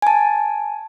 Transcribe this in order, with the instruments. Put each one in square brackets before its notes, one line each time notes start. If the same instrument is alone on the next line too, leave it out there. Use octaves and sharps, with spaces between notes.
[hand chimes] G#5 A5